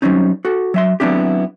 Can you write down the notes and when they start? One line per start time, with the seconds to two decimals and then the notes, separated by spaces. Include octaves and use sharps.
0.02 F#3 G3 C4 C#4 D#4
0.45 F#4 A4
0.74 F#3 E5 C6
1.00 F#3 B3 C4 D4 E4 G4